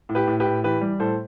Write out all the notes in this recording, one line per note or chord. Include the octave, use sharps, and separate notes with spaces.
A2
G4 B4
A2
G4 B4
A2
E3 G4 B4
G3
A2 A4 C5